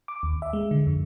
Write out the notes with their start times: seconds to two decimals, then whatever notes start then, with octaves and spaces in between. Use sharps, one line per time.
0.08 D6
0.23 D#2
0.42 E5
0.53 G#3
0.71 D3
0.87 F2